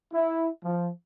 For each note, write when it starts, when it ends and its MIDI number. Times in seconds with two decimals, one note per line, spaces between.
0.14 0.49 64
0.64 0.89 53